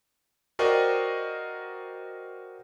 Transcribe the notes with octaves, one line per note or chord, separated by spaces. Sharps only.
F#4 A#4 C5 D5 D#5 G5